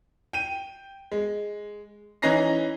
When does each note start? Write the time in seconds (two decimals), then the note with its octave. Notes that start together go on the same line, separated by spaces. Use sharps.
0.33 G5 D#7
1.12 G#3
2.22 E3 C#4 D#4 A#5 A#6 C7